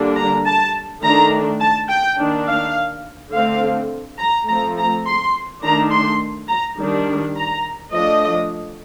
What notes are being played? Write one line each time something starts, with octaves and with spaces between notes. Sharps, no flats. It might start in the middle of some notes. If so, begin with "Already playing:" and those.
Already playing: D3 G3 A#3 D4
A#5
A5
D#3 A3 D4 A#5
A5
G5
D#3 A#3 D4
F5
D3 A3 C4 F5
A#5
F3 A3 C4 A#5
A#5
C6
D#3 A3 D4 A#5
C6
A#5
D#3 G3 D4
A#5
F3 A3 D4 D#5